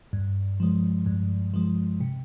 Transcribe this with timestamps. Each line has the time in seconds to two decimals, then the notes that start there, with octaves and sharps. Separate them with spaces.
0.13 G2
0.60 F3 G#3
1.06 G2
1.54 F3 G#3
2.01 C3